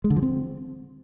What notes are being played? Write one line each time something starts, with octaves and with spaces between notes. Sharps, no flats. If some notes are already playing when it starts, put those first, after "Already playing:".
G#3
D3
F3
C4